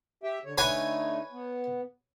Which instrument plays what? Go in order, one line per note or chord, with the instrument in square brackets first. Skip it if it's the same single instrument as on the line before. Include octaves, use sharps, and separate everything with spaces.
[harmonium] G4 E5 G5
D3 C#5
[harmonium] D3 A3 D#4 [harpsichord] B4 C#5 G#5
[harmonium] B3